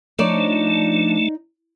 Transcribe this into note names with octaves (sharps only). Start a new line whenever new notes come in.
F3 A3 D4 D#4 C#5 D5